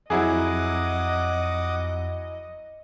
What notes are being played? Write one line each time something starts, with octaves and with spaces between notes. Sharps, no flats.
F2 F#3 E4 G#4 D#5 F#5 D6 D#6